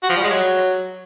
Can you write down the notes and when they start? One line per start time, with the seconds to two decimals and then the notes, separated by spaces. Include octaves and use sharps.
0.03 F#4
0.10 F3
0.17 G3
0.23 G#3
0.30 F#3